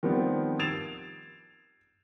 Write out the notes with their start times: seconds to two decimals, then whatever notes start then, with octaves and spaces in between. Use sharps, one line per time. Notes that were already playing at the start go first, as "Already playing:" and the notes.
0.03 D#3 F3 G3 B3 C4
0.59 G#6 A6 C7 D7 E7 F7